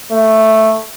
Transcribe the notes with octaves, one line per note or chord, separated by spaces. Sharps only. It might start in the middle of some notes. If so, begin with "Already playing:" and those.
A3